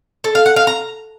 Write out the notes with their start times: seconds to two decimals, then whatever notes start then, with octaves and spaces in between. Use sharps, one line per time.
0.24 A4
0.35 F5
0.46 F#5
0.56 F5
0.67 A#5